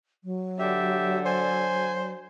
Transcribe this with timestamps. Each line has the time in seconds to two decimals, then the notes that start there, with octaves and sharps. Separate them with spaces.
0.24 F#3
0.59 D3 G4 E5
1.25 C5 G#5